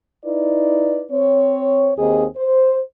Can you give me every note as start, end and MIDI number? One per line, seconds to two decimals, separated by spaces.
0.25 1.05 63
0.25 1.05 64
0.25 1.05 71
0.25 1.05 74
1.11 1.91 60
1.11 1.91 73
1.97 2.25 39
1.97 2.25 60
1.97 2.25 63
1.97 2.25 68
1.97 2.25 75
2.36 2.79 72